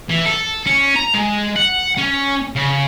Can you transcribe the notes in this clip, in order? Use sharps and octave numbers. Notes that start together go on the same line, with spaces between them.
E3
A4
C#4
A#5
G#3
F#5
C#4
C#3